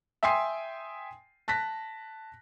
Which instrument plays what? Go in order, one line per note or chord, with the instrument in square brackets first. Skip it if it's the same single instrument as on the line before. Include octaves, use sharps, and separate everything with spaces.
[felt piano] E5 G5 G#5 C6 D#6 C7
A5 F#6 A#6 B6